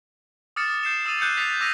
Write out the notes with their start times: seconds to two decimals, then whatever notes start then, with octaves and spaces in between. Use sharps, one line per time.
0.56 D6 D#6 F6 A6 C#7 E7
0.83 G6 C7 E7
1.06 D#6 E6 A6 D#7 F7 F#7
1.19 F#6 G6 C#7 D#7 E7
1.37 D#6 F#6 A6 B6 C#7 F7
1.61 D6 E6 A#6 B6 D#7 F7